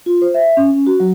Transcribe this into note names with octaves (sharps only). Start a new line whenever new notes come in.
F4
C5
E5
C#4
C#4
F#4
F#3